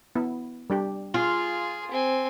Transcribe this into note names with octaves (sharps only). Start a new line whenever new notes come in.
B3 E4
G3 D4 G4
F4 G#4
C4 G#5